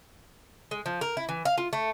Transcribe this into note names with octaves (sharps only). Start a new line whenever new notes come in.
G#3
F3
A#4
E4
E3
F5
F4
A3